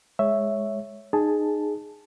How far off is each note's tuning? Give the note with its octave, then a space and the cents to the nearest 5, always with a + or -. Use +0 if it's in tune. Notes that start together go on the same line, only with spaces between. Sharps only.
G#3 +0 C#5 +0 E5 +0
D#4 -25 G#4 +0 A5 +0